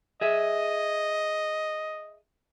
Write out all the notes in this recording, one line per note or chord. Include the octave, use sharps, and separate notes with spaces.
G#4 D#5 E5